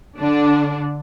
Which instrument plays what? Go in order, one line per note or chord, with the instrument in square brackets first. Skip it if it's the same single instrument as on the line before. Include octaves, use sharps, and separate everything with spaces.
[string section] D3 D4